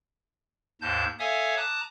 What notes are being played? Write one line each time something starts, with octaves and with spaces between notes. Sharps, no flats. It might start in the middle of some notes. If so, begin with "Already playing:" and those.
D#2 G#2 A5 G6
A4 C#5 E5 F5 G#5 D#6
A5 A#5 D6 D#6 F#6